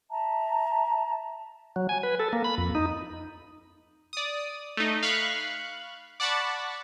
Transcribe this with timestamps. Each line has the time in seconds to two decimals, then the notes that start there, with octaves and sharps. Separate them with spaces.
0.10 E5 A5 A#5
1.76 F#3
1.89 G#5
2.03 B4
2.20 A4
2.33 A#3
2.44 B5
2.58 F2
2.75 D#4
4.13 D5 D#6
4.77 A3 D#4
5.03 F5 B5 C#6 F#6
6.20 D5 F#5 A5 B5 C#6